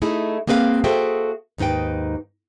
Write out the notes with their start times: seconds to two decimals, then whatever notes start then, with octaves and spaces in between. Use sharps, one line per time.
0.02 A3 D#4 E4 G#4
0.47 A#3 C4 G#4 B4 C#5 F5
0.84 F#4 G#4 A4 C5 E5 G5
1.58 D#2 G#2 D#4 B4 G5